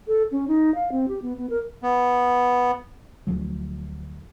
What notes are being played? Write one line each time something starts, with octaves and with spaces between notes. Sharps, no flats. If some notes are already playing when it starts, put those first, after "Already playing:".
A4
C#4
D#4
F5
C4
G4
B3
B3
A#4
B3
D2 F3 F#3